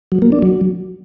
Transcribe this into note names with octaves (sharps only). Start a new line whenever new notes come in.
F#3
A#3
D4
F#3